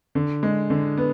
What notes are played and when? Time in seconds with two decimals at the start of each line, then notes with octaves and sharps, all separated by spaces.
0.15 D3
0.43 G#3
0.70 D3
0.97 B3